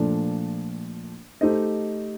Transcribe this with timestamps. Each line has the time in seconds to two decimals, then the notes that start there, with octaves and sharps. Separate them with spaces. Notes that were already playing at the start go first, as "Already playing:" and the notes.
Already playing: A#2 F3 A3 D4
1.41 A3 D#4 G4 C5 D#5